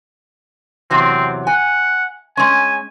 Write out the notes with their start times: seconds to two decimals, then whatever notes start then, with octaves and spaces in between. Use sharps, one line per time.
0.91 E2 C3 F#3 C4
1.47 F#5 G#5
2.37 G#3 C#4 G#5